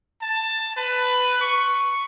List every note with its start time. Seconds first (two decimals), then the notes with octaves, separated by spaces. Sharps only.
0.21 A5
0.76 B4
1.41 C#6